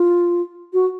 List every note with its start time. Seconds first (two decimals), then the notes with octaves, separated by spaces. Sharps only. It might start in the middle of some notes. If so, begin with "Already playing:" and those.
Already playing: F4
0.73 F#4